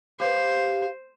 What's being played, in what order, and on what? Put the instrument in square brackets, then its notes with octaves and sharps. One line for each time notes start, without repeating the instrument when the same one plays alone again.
[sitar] G4 B4 [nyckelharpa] C5 [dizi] F5